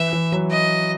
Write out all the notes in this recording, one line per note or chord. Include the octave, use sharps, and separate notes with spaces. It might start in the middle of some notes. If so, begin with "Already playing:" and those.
Already playing: E3 E5
E3
F#3
D#5